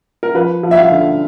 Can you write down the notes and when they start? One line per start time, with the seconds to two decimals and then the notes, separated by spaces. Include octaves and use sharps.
0.23 A#4
0.34 F3 B4
0.63 F3
0.71 E5
0.77 F5
0.91 D3